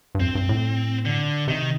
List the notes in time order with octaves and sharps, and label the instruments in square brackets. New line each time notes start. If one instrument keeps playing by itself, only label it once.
[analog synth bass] G2
[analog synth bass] F2 [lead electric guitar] C4
[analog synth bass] G2
A2
[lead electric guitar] D3
[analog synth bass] C3 [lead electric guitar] D#3